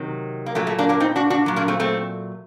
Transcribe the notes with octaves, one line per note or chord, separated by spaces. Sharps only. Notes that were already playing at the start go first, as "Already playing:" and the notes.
Already playing: C3 D#3 F#3
A#3
A#2 F#3 A3
A3
A#3 D4
A#3 D4
C4 D#4
D4 F#4
D4 F#4
A#2 F#3
A#3 D4
A3 C4
A3 C4